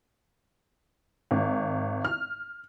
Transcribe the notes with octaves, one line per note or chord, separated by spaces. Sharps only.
G#1
F6